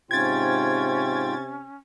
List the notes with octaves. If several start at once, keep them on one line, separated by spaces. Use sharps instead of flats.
G#2 C3 C#4 F4 G5 G#6 A6